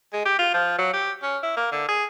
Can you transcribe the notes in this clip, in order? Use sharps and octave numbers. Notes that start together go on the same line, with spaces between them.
G#3
G4
F4
F3
F#3
G4
C#4
E4
A#3
D3
G#4